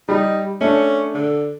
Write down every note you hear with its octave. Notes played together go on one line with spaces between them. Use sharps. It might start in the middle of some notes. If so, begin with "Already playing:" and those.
G3 D#4
A3 C#4 D4
D3